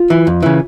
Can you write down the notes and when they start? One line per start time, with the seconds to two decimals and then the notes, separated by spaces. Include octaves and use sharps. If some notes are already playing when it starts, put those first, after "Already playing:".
Already playing: F4
0.10 E3
0.27 F2
0.43 C#3 E3